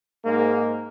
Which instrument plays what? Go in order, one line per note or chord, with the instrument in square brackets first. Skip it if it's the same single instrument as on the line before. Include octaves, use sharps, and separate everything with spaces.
[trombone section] G#2 A#3